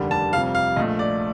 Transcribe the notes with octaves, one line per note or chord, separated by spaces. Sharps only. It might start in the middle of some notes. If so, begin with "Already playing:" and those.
Already playing: F1 D#2 D3 G3 D4
A5
F2 C3 G3 F5
F5
A#1 A#2 A3 D#5
D5